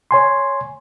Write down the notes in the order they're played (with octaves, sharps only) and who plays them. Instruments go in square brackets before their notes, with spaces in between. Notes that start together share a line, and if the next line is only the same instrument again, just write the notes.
[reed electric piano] C#5 G#5 C6